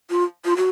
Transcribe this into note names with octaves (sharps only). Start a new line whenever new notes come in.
F4
F4
F#4